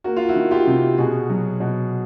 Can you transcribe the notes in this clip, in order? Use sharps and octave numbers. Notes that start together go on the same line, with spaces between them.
A#3 F#4
F4
E4 F#4
D#3
F4 G4
C3
B2 F#4 G#4
F#3
B2